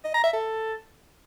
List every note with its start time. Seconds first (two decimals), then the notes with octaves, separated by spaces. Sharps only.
0.04 D#5
0.14 A#5
0.24 E5
0.33 A4